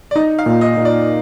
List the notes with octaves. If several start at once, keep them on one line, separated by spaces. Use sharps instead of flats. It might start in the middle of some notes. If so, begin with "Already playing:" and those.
D5
D#4 D#5
F5
A#2
D#5
A#2
D5